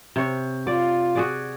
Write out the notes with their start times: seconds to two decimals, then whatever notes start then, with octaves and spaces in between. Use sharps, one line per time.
0.16 C3 C#5
0.67 F4 D5
1.15 F#4 G#4 D5